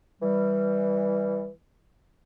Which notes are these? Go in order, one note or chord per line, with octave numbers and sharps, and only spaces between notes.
E3 G3